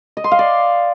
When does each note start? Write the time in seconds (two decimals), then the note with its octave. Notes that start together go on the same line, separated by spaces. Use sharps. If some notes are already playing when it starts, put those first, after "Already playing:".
0.17 D#5
0.24 C6
0.31 F5
0.39 D5